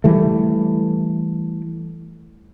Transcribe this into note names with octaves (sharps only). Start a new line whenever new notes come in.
E3 G3 A3